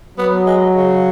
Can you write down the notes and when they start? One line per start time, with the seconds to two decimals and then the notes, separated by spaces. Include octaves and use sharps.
0.18 F#3 B3
0.47 G#3
0.75 C#3